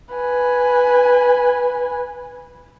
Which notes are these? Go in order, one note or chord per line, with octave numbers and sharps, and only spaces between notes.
B4 G#5